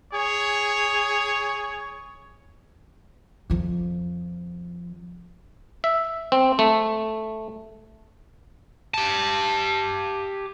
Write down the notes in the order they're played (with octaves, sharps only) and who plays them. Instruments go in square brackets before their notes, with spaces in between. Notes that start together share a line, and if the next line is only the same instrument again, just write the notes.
[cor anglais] G#4 [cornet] C#5
[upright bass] F2 F3
[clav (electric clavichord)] E5
C4
A3
[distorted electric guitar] G4 A5